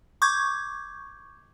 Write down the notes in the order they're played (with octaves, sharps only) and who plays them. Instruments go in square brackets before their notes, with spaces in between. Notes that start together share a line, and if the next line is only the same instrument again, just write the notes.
[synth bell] C#6 D6 G6 G#6